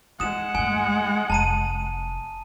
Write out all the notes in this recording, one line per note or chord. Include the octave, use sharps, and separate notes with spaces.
E3 G#3 F#5 D#6 E7
G2 A3 G#5
F1 A5 A#5 D#7